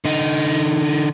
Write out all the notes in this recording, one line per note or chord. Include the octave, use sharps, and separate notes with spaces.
D3 D#4